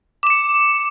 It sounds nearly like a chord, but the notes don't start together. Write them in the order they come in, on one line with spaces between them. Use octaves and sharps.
D6 E7 C#7